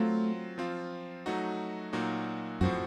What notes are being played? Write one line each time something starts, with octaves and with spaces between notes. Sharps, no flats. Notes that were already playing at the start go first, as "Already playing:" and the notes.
Already playing: F#3 A3 C4 F4
F3 C4 F4
F#3 A3 D#4 F#4
A#2 F#3 A#3 D#4 F#4
F#2 A2 F3 C4 F#4